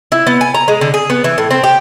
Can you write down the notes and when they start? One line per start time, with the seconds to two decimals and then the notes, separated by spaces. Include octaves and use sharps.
0.12 E4
0.27 B3
0.41 G#5
0.55 A#5
0.68 G#3
0.81 D3
0.94 G#4
1.10 B3
1.24 E3
1.38 A2
1.51 C4
1.63 G4